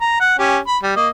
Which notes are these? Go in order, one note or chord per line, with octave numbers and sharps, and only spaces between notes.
A#5
F#5
C#4 G4
B5
G3
A#3 D#5